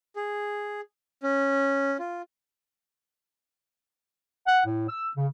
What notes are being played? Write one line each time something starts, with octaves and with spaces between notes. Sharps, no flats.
G#4
C#4
F4
F#5
A2
E6
C#3